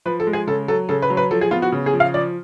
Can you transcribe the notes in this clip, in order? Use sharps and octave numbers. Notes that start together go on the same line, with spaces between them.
F3 B4
A4
G#3
G#4
C#3 A4
F#3 A4
C#3 A4
B4
F#3
B4
F3 A4
G#4
B3 F4
F#4
C#3
G#4
F3
F5
F3 D5